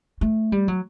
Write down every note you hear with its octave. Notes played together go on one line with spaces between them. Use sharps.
A3
G3
F#3